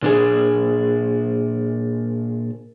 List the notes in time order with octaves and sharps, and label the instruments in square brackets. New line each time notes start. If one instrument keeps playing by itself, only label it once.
[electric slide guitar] A#2 D4 G#4